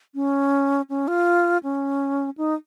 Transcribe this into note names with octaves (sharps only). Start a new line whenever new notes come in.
C#4
C#4
F4
C#4
D#4